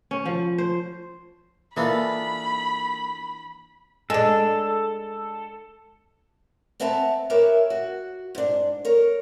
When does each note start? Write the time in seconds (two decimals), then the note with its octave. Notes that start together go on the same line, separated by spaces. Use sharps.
0.11 C#4
0.25 F3
0.58 C5
1.76 E3 A#3 D4 D#4 F4 A4 B5
4.10 G#3 D4 A4
6.80 B3 C4 B4 E5 A5 A#5
7.30 G4 A#4 B4 C#5 E5
7.70 F#4
8.35 G#2 D4
8.85 A#4 C#5